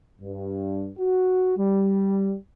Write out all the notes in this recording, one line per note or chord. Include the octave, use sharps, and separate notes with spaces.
G2
F#4
G3